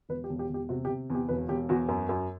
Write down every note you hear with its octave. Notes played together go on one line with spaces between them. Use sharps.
E1 B4
G4
E1
G4
E1
G4
C3 F#4
G4
C3
E2 G4
E1 B4
E1 G4
E2 F#4
F#2
F#2